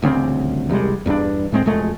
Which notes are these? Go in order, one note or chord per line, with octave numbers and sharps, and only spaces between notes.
D#1 D2 C#3 C4
E1 C2 G3 G#3
E2 G2 F#3 D4
A2 G#3 C4
E1 F2 G#3 A3